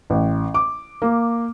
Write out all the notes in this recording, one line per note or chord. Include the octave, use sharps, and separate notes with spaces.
A1
D6
A#3